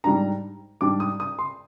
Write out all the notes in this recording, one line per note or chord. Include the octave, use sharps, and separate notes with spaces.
G#2 G3 D4 A#5
G#2 G3 D4 D6
D#6
D#6
C6